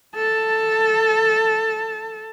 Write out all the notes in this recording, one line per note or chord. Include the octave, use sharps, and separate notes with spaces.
A4 A5